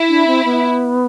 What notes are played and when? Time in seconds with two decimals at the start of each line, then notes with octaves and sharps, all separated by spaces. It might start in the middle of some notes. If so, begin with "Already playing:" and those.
Already playing: E4
0.09 D4
0.27 C4
0.45 B3